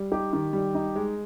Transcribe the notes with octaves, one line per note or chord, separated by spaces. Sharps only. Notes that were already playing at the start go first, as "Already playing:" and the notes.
Already playing: G3
D#4 G4
D#3
G3
D#4
G#3